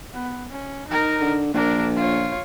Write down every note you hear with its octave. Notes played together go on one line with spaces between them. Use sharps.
B3
C#4
D#4 A#4
D3
A#1 D4 A#4
F4 C#5